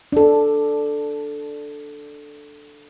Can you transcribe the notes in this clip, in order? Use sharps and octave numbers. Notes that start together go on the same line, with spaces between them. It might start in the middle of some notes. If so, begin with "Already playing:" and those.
D4 A4